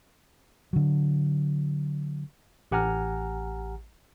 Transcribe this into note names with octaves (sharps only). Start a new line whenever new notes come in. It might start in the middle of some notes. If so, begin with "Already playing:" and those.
D3 F#3
A1 G4 F#5 G#5 A#5 F6